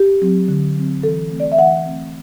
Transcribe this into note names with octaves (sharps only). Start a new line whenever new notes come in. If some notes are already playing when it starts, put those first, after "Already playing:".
Already playing: G4
F#3 C4
D3
F#3 C4
E3 A4
A3 C4
D5
E5
E3 F#5
A3 C4